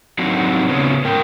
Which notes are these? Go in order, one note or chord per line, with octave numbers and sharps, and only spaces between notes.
F#3 C4 D4 D#4 F#4
C#3 B3 C#4
G#2 A#4 G5